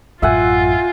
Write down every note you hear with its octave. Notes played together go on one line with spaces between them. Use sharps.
A1 F#2 F4 E5 F#5 G#5